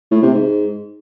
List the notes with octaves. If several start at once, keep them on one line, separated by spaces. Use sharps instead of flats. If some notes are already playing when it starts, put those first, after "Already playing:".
A2
C3
G#2